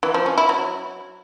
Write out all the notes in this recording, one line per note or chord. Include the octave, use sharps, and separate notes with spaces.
E3
F3
C#4
E4
F#3